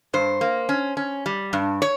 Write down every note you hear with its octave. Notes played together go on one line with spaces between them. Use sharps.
G2 C5
A#3
C#4
C#4
G3
G2
C#5